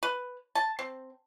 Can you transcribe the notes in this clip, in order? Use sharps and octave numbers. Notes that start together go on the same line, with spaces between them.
B4
A5
C4